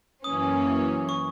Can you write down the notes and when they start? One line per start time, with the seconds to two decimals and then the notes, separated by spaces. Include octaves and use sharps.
0.24 F#2 E3 A#3 C#4 D#6
1.09 C#6